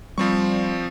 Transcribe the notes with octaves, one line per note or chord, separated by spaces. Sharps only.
F3 G3 C4 C#6